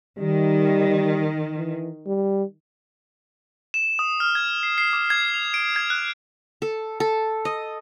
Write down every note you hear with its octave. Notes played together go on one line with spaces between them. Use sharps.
D#3 G3
E3
G3
E7
D#6
F6
G#6
C7
C7
D6
G#6
F7
D7
G#6
F#6
A4
A4
D#5